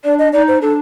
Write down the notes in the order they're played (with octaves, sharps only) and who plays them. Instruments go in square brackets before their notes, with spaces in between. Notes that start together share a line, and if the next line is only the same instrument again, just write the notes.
[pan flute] D4 [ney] D5
[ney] D#5
[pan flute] D#4 [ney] D5
[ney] C5
[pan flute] D4 [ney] A4